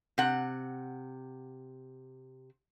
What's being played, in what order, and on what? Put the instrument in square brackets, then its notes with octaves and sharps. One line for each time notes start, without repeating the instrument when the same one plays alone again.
[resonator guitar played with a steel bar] C3 F#5